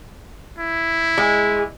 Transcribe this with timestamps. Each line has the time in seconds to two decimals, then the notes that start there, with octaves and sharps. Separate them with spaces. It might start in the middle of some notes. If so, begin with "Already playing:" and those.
0.58 E4
1.18 G#3